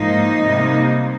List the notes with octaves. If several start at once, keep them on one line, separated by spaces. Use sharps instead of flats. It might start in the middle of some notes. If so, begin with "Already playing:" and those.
Already playing: G#2 F3 A#3 D#4
C3 G3 A#3